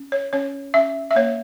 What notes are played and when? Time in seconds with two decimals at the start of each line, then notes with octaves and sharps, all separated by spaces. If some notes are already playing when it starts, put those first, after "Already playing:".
Already playing: C#4
0.12 C#5
0.33 C#4 C#5
0.74 C#4 E5
1.11 E5
1.16 A#3 C#5